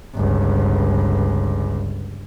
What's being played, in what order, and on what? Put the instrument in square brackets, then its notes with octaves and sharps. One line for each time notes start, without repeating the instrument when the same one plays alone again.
[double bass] G1 C#2